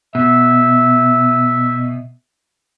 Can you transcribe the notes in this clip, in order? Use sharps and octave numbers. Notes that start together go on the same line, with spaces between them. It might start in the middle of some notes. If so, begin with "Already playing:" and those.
B2 E5